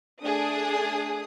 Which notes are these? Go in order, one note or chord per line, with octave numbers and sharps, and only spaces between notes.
A3 D4 G#4 D#6